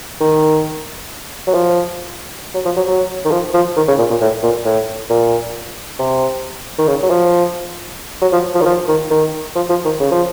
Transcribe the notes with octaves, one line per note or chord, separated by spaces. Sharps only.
D#3
F#3
F3
F#3
F3
F#3
F#3
D#3
F3
F3
D#3
C#3
A#2
A#2
A2
A#2
A2
A#2
C3
D#3
C#3
F#3
F3
F#3
F3
F3
D#3
F3
D#3
D#3
F3
F3
D#3
C#3
F3